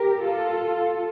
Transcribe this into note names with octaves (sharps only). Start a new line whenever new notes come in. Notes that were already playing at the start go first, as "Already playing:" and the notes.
Already playing: G4 A#4
F4 A4